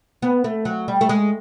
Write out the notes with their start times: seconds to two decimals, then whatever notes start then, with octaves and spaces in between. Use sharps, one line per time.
0.22 B3
0.44 A3
0.65 F#3
0.88 G3
1.01 A3
1.09 G#3